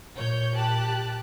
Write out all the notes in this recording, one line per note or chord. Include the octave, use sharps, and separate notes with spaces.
A#2 C#5 G6
G4 A5 F#6